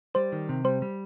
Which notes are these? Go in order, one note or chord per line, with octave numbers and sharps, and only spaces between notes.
G3 C5
D#3
C3
G3 C5
G3